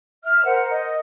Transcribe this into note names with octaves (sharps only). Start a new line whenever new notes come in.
E5 F6
A#4 C5 F#5
D#5